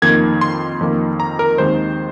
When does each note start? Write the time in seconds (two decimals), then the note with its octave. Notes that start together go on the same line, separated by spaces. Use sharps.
0.02 F2 D#3 A#3 G#6
0.41 C6
0.81 F2 D#3 A#3
1.20 A#5
1.39 A#4
1.58 D#2 D#3 G#3 C4 C5